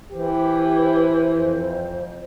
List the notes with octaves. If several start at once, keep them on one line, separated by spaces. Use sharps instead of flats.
E3 G4 C5
F2